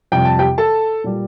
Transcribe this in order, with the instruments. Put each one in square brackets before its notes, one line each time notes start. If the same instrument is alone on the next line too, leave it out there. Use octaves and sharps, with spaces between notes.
[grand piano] F2 C3 G3 G5
A5
G4 G5
A4 A5
A#2 G3